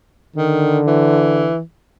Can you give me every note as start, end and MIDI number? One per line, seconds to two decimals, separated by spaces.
0.36 1.50 50
0.36 0.81 51
0.87 1.60 52